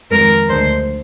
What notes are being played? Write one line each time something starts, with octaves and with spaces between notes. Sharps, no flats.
F2 D#3 G#3 A#4
D2 D3 G#3 C5